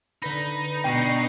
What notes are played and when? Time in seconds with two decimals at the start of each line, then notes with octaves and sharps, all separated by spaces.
0.22 D3 D#4 B4 B5
0.84 B2 D4 G5